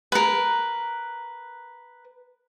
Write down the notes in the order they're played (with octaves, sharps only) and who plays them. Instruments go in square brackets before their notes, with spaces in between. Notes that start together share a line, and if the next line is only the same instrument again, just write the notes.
[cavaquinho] A#4 B4